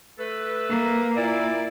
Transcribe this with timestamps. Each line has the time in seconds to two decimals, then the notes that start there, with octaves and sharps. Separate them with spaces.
0.19 A3 A4 B4
0.70 A#3
1.16 A#2 E4 D5